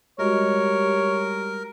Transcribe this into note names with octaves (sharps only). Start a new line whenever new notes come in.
G3 G#3 F#4 A#4 C#5 D#5